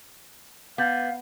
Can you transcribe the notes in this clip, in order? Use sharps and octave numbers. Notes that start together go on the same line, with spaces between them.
B3 F5 D6 G6 A6